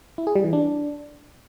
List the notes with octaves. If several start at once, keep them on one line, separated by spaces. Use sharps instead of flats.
E4
G#4
G3
E3
D4